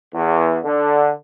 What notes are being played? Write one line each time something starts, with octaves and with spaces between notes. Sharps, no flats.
E2
D3